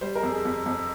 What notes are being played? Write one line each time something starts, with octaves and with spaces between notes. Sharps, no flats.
G3 C5
A#4
F2
G#4
F2
F2